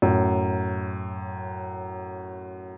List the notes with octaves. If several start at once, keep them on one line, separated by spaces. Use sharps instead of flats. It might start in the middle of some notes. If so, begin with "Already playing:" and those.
F#2 A2